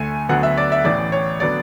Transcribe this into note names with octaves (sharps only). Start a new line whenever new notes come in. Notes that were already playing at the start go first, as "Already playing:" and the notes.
Already playing: D2 D3 A3 G#5
D2 D3 F#3 B3 F#5
E5
D5
E5
A1 A2 E3 D5
C#5
D3 F#3 B3 D5